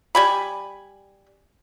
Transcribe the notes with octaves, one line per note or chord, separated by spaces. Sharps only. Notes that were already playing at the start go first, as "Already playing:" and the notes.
G3 G#5 B5